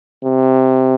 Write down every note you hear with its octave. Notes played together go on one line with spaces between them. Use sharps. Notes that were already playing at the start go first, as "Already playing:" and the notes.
C3